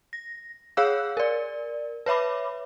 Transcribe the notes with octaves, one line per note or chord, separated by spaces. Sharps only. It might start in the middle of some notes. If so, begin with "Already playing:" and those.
A#6
G#4 C#5 F5 E6 F#6
A#4 D5
B4 C#5 E5 B5 D6